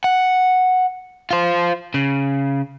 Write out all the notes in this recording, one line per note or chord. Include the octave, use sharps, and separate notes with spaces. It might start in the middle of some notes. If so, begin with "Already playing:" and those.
F#5
F4 C5
C#3